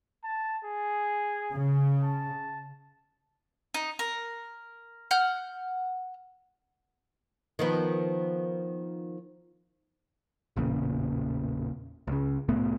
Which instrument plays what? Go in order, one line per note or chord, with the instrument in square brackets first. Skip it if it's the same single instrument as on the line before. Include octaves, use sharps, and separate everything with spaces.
[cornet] A5
G#4
[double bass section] C#3
[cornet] A5
[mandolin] D#4
A#4
F#5 F6 G6
[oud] D#3 F3 B3
[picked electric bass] A1 E2 A#2 C#3
C#2 C#3
C2 A2 A3 B3